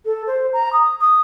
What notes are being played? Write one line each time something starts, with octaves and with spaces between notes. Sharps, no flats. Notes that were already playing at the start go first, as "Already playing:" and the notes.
A4
C5
A#5
D#6
D#6